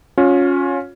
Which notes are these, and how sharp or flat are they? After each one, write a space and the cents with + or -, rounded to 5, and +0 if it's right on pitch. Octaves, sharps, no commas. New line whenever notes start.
C#4 +0 F4 +35